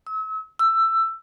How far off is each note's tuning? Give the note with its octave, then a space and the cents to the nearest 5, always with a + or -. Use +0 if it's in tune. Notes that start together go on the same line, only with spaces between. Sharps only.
E6 -40
E6 +15